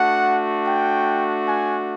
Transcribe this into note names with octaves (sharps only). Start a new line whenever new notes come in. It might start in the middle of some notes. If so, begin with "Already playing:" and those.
Already playing: A3 D4 F#4 F#5
G5
G#5